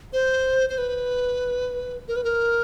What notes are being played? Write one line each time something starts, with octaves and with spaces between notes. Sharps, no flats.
C5
C5
B4
A#4
B4
A#4